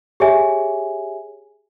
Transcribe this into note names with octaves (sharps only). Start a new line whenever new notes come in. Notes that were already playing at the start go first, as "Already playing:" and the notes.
G4 G#4 C#5 E5 G#5